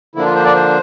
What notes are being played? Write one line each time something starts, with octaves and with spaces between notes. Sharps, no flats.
D3 F3 A#3 D4 E4
F4
C5
D5
C5